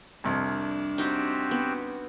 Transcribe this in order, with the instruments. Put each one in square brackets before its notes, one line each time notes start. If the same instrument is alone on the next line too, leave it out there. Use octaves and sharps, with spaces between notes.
[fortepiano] C2 F2 [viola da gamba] D4
[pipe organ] C4 F#4 G4 [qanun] D#4 G5
[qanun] B3